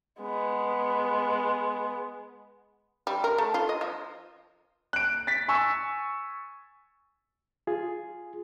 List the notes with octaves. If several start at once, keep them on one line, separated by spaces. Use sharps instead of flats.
G#3 B3
G3
A#4
A3
F4
D#5
F3
F#6 D7
A6 B6
G#5 C#6 E6
F4 G#4